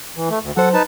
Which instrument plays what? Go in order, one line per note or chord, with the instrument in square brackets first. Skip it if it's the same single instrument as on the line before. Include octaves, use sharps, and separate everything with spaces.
[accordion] E3
A3
D2
[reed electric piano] F#3 C5 [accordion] A4 F#5
[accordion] D#4 B4 A5